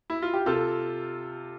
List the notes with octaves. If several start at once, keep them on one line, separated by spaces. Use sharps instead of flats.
E4
F4
G4
C3 F4 A4